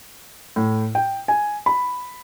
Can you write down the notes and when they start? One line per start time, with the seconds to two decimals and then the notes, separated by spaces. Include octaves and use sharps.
0.56 A2
0.95 G5
1.28 G#5
1.66 B5